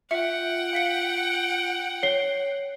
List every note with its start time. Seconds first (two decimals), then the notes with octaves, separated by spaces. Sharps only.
0.11 F4 E5 F#5 G5 C#7
0.73 F5 B6 C#7
2.03 C#5 C7 G7